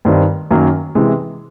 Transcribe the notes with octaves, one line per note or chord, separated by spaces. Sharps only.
G2 D#3 G3 C4
F#2 D#3 F#3 A#3
C3 E3 G#3